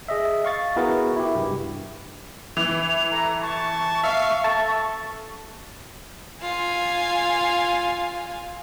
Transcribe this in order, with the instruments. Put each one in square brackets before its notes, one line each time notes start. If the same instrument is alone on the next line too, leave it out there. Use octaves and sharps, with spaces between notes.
[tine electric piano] G#4 D#5 E5
F5 C#6 A6
B3 E4 F#4 G#4 A#4 B4
E4 G4
C2 G2
[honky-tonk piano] E3 [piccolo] F7
[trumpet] A4 [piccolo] A#5
[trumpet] A5 [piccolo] C#6
[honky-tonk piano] E5 [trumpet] F5
[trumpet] A4 [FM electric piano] A5
[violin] F4 G#5